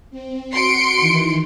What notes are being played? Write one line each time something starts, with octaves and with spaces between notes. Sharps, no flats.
C4
F#4 C6 C#7 D7
D#3 E3